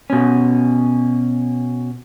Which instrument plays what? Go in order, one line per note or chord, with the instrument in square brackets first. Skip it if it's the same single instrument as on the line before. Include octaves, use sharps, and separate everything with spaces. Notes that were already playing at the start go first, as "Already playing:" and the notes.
[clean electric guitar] B2 C#4